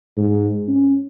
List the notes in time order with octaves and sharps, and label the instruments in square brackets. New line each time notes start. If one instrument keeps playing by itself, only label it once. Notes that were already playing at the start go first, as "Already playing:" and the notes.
[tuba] G#2
C#4